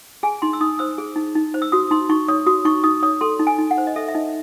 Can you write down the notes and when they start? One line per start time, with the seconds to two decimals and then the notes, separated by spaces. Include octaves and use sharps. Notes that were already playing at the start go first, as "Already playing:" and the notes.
0.23 G#4 G#5
0.42 D#4 C6
0.53 E6
0.61 D#4 D#6
0.79 C5 E6
0.98 G#4
1.16 D#4
1.35 D#4
1.54 C5
1.62 E6
1.72 F#4 D#6
1.91 D#4 C6
2.10 D#4 C#6
2.28 C#5 D#6
2.46 F#4 D#6
2.65 D#4 C#6
2.84 D#4 D#6
3.03 C#5 D#6
3.21 A4 C6
3.39 D#4
3.47 G#5
3.58 D#4
3.71 F#5
3.78 C5
3.87 D#5
3.96 A4 E5
4.08 E5
4.14 D#4 D#5